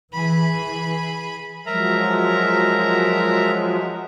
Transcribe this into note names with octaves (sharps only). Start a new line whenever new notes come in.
E3 G#4 B5
F3 F#3 G#3 A#4 E5 A#5